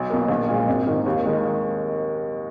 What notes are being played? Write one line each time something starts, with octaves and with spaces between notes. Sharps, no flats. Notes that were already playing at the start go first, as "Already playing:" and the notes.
Already playing: B1
B2 A#3
A#1
A#2 G#3
G#1
G#2 D#3 A#3
D#2
D#3 G#3